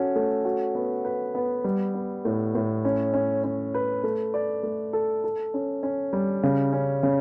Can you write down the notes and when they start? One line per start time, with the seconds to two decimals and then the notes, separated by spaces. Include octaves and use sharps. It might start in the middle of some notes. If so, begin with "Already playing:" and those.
Already playing: C#4 F#4 A4
0.16 A3
0.45 F#4
0.75 B3
1.05 B4
1.35 B3
1.64 G3
1.94 B3
2.25 A2
2.55 A2
2.85 C#4
3.14 C#4
3.44 C#4
3.74 B4
4.04 A3
4.34 D5
4.63 A3
4.93 A4
5.24 A4
5.54 C#4
5.83 C#4
6.13 G3
6.43 C#3
6.73 C#4
7.03 C#3